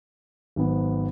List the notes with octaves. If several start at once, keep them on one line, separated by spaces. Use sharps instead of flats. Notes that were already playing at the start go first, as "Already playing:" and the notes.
G#1 G#2 F#3 B3